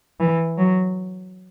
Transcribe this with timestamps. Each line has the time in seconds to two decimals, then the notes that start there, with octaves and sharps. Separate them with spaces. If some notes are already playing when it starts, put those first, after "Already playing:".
0.20 E3
0.58 F#3